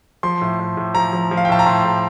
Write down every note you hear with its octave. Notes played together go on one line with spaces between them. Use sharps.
F3 C6
A2
A2
A2
F3 A#5
F3
F3
F5
G5
A2 A5
A#5
A2 C6
A2